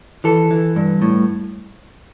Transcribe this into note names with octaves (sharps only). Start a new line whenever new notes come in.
E3 A4
E3
G2
A2